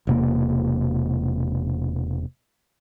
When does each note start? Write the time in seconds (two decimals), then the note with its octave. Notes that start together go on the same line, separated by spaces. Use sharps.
0.07 E1 C3 A#3